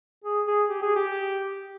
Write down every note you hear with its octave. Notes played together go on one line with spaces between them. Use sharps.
G#4
G#4
G4
G#4
G4